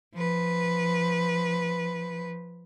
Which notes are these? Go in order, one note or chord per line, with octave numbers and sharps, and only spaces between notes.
F3 B4